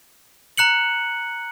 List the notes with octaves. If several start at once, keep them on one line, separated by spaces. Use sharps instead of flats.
A#5 F#6 C#7 F#7